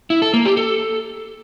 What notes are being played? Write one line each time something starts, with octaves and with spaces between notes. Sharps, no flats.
E4
A4
A#3
G4
A4